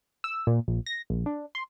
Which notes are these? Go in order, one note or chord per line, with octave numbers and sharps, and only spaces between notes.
E6
A#2
A#1
A#6
A#1
D4
C6